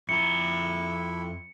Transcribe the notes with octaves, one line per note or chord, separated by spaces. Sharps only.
F2 E4 A#5 C#7